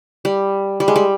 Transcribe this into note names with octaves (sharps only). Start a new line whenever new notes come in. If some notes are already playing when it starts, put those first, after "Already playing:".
G3
G3
G#3
G3